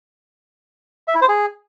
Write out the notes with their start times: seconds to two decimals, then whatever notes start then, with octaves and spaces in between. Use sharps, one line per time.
1.08 E5
1.15 E4
1.22 C5
1.28 G#4